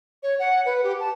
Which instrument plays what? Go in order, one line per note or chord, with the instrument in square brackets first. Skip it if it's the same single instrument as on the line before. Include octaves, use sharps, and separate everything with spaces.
[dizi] C#5
F#5
B4
G4
A5